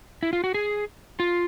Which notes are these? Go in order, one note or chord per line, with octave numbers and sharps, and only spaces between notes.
E4
F4
F#4
G#4
F4